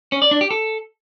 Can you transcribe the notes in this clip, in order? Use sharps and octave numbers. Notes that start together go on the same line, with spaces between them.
C#4
D5
D4
G4
A4